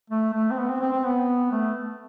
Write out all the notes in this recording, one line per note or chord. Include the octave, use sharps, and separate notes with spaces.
A3
A3
C4
B3
C4
C4
C4
B3
A3